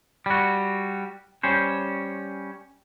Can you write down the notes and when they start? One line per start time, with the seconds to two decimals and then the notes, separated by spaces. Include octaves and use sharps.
0.26 G3 F#4
1.43 G3 C#4 C5